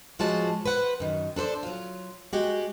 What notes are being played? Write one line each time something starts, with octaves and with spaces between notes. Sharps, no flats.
A2 F3 G#3 F4 F#4 A5
B4 C5 F#5
F#2 D#3
D4 A4 B4 C5 D5
F#3 F4
G#3 F#4 G4